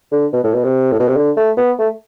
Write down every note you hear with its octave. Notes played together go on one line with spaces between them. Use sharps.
D3
B2
A2
B2
C3
A2
B2
C3
D3
A3
B3
A3